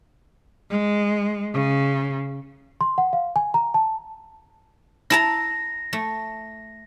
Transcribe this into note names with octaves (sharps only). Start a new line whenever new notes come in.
G#3
C#3
C6
F#5
F5
G#5
A#5
A5
E4 A5 A#5 A#6
A3